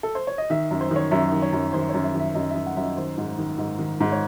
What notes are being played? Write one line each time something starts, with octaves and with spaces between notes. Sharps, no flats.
A4
C5
C#5
D#5
D#3 E5
F#2
C5
D#3 C#5
F#2 E5
D#3
C#5
F#2
D#3 C5
C#5
F#2
E5
D#3 E5
F#2 D#5
E5
D#3
F#5
F#2 D#5 E5
D#3 C5
G#2
D#3
G#2
D#3
G#2
C#5